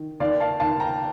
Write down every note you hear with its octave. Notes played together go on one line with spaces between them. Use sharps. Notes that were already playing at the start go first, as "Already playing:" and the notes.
Already playing: D#3
D#2 D5 F5
F5 A5
D#2 F5 A5
G5 A#5